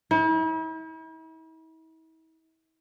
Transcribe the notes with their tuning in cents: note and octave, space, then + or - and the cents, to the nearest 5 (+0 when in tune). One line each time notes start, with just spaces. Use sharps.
E4 -45